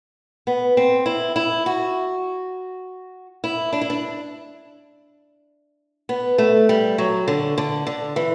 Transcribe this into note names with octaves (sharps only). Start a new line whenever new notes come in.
B3
C4
E4
E4
F#4
E4
D4
E4
D4
B3
A3
G3
F#3
D3
D3
D3
E3